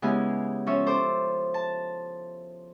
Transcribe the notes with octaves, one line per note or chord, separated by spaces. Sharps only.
C#3 G#3 B3 E4 G4 G#5
F3 C#4 C#5 E5
A4 C5 D6
A5